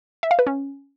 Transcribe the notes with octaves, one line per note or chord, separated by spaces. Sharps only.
E5
F5
B4
C#4